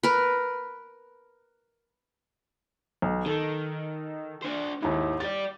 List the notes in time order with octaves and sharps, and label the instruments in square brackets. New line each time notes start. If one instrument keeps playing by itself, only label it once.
[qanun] A#4 B4
[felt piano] B1
[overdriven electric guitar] D#3 [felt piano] A4
[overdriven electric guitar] D4 C5
[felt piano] D#2 E4 [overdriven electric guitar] G#2
[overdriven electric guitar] G4 D5 [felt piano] A6